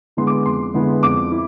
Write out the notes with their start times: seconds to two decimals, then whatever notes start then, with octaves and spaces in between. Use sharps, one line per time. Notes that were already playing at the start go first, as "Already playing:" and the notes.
0.17 D3 G#3 B3 E4 C6
0.27 D6
0.46 F2 C6
0.74 D3 G#3 B3 E4
1.03 F2 D6
1.32 E4